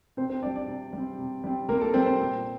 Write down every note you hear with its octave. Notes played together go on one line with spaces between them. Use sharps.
C3 C4 C5
C4 C5
G3 C4 D4 D5
D4 D5
C3
G3 C4
C3
G3 C4
C3 A#3 A#4
A4
G3 C4 C5
C4 C5
A#2